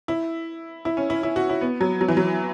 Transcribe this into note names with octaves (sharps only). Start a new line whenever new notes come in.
E4
E4
C#4
E4
E4
F#4
E4
B3
F#3
F#3
E3
F#3